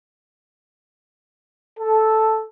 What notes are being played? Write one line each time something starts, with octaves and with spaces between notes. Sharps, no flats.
A4